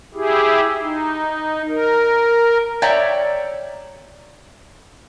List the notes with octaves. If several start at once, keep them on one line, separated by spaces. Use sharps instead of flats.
E4 G4 G#4
D#4
A#4
C#5 D5 E5 G5 A#5